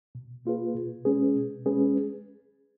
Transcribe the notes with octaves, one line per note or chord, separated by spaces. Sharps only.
B2
A#3 F4 G#4 B4
B2
G#3 C#4 G#4 B4
B2
G#3 C#4 G#4 B4